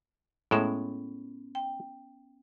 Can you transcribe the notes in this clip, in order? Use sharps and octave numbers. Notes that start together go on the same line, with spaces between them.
A2 G#3 B3 C#4
G5